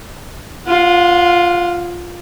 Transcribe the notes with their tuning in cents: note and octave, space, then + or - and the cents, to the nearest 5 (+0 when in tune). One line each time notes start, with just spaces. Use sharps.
F4 +0 F#5 -30